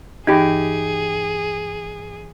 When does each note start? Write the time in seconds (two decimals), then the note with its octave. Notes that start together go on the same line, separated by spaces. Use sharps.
0.27 G2 E3 D#4 G4 G#4